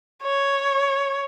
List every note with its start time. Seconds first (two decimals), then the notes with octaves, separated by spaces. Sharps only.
0.22 C#5